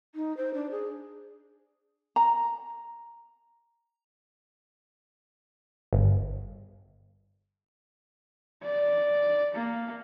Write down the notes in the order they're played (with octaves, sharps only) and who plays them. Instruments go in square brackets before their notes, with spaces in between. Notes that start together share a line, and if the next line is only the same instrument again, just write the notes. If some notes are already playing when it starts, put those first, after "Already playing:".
[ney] D#4
C5
D4
G#4
[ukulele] A#5
[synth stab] G1
[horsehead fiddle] D5
A#3